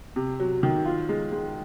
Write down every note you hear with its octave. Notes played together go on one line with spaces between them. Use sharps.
C3
F#3
D#3
F4
G#3
G#3